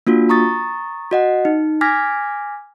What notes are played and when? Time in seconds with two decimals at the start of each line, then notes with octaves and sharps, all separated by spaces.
0.07 A#3 D4 F4 F#4
0.29 A#5 C#6 D#6 A6
1.11 F#4 D#5 F#5
1.45 D#4
1.81 G#5 D6 F6 G#6 A#6 B6